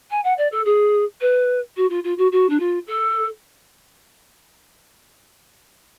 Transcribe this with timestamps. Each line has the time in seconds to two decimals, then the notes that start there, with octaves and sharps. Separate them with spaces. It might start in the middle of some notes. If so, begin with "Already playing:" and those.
0.10 G#5
0.24 F#5
0.37 D5
0.51 A4
0.65 G#4
1.20 B4
1.76 F#4
1.89 F4
2.04 F4
2.18 F#4
2.31 F#4
2.49 D4
2.59 F4
2.87 A4